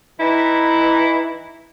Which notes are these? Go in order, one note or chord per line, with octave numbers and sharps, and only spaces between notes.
E3 D#4 E4